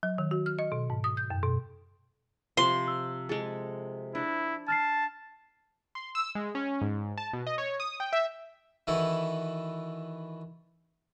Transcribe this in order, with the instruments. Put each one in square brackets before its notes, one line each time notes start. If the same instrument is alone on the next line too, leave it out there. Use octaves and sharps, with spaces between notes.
[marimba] F#3
D#3
F#4
F6
D#5
B2
G#2
D#6
G6
F#2
B2
[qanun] C3 F3 [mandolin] C6
[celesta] E6
[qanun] G#3 A4 [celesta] G#4
[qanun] D4 [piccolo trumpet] E4
[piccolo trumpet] A5 [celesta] F6 A6 C7
[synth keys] C6
E6
G#3
C#4
G#2
A5
B2
D#5
C#5
D#6
G5
E5
[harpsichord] D#3 E3 E4 F#4 A4 B4